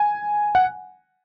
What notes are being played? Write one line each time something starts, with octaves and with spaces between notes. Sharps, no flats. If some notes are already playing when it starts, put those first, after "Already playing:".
Already playing: G#5
F#5